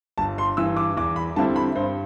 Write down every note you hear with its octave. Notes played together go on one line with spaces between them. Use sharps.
G1 A5
C6
G2 E3 E6
D6
E2 D6
B5
D3 G3 C4 E4 A5
B5
G2 C5